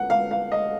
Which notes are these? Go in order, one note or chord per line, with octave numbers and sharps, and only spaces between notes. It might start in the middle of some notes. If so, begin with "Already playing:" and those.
Already playing: F#5
F5
F5
D#5